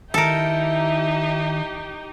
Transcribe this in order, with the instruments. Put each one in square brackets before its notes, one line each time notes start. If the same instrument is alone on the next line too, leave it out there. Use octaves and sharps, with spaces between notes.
[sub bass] D#3 [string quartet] D#4 G4 [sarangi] E4 [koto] A4 A#4